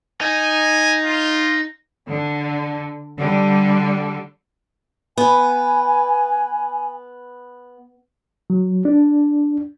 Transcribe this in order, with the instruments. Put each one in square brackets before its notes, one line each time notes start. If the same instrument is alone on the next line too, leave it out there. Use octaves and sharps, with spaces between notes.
[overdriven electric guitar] D#4 [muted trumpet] G#5
[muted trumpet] F4
[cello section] D3
D3 G3
[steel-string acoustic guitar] B3 [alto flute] G#5
[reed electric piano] F#3
D4